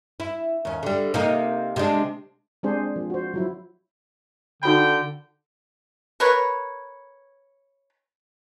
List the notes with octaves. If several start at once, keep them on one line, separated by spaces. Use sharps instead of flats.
E4
D#2 C#4
D3 G3
C3 A#3 D#4
C3 G#3 D4
G3 G#3 C4 D4 G#4 C5
F3
F#4 C5
F3 F#3 E4
D3 D#4 F#4 G5 B5
A#4 B4 C#5